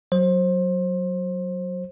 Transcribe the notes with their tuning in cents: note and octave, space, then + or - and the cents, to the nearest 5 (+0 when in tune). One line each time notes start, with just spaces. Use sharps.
F#3 +0 C5 +25